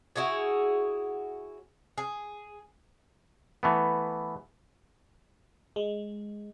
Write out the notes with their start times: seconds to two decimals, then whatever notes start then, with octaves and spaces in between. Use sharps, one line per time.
0.16 E4 F#4 G#4 C#5
1.98 G#4
3.63 E3 A3 B3
5.76 G#3